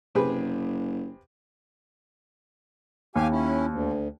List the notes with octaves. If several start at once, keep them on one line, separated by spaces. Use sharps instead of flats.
F#1 C3 G#4 B4
D#2 G4 F5 G#5
C#4 E4
D2